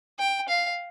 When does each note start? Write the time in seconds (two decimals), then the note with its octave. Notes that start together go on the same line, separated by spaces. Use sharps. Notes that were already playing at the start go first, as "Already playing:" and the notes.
0.19 G5
0.48 F5